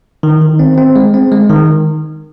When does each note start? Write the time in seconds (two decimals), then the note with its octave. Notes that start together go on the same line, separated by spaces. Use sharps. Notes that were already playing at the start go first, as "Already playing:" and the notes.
0.23 D#3
0.41 D#3
0.59 C4
0.78 C4
0.96 G#3
1.14 C4
1.32 G#3
1.50 D#3